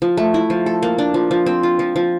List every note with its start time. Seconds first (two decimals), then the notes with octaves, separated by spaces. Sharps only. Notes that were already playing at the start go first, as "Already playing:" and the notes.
0.02 F3
0.17 A3
0.34 E4
0.50 F3
0.66 A4
0.83 A#3
0.98 D4
1.14 F3
1.31 F3
1.46 C4
1.63 F4
1.79 F3
1.96 F3